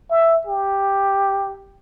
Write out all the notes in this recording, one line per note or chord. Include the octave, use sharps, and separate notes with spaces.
E5
G4